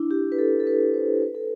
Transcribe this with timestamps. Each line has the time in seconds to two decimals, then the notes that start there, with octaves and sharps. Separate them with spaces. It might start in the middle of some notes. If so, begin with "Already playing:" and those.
Already playing: D4 E4
0.11 G4
0.32 B4
0.38 A4
0.60 A4
0.67 B4
0.94 C5
1.22 B4
1.35 A4